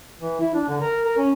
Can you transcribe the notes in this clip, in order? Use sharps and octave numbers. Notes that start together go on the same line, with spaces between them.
E3
E4
D4
D3
A#4
A#4
C#4